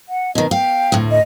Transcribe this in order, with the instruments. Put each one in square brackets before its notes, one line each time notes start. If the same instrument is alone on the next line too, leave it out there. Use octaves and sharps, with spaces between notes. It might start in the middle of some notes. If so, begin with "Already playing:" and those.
[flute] F#5
[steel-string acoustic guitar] B2 D#3 [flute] D#5
[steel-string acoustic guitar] F5 [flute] G5
[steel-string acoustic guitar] D2 A2
[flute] D#5